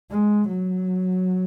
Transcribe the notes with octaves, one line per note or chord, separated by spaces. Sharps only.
G#3
F#3